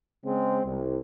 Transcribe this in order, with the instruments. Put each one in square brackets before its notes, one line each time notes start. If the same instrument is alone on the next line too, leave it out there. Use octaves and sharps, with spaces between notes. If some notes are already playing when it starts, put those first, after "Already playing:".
[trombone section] C#3 G#3 C4
C2